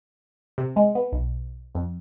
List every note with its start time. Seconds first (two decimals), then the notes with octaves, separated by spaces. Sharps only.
0.58 C3
0.76 G#3
0.95 B3
1.12 B1
1.75 F2